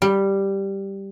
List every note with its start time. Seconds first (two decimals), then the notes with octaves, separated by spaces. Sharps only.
0.02 G3